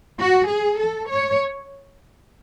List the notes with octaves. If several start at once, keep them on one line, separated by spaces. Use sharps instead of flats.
F#4
G#4
A4
C#5